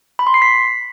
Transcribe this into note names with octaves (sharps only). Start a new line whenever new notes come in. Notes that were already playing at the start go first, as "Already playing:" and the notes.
B5
C6
C7
B6